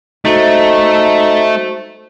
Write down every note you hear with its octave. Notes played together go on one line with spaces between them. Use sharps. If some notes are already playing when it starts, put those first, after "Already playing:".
A3 D#4 F#4 C5